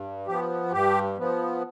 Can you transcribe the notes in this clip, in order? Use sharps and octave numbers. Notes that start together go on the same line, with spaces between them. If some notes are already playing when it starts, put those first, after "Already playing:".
Already playing: G2
F3 B3 G4
G2 G4
F3 B3